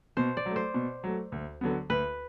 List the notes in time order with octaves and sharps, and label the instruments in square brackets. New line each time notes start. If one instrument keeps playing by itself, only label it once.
[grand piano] B2 [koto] C5
[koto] D5
[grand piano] F#3 A3
[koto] C5
[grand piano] B2
F#3 A3
D2
D3 F#3 B3
[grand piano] D2 [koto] B4